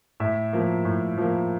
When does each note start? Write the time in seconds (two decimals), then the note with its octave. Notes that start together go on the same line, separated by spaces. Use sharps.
0.20 A2 E5
0.53 F3 A#3
0.85 A2
1.17 F3 A#3